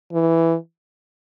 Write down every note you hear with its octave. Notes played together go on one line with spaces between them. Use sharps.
E3